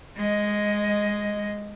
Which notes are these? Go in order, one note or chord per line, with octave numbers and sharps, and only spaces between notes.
G#3 D#5